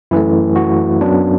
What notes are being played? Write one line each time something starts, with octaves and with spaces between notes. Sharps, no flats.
F#2 E3 A3 E4
F#4
F#2 F#3 B3 D4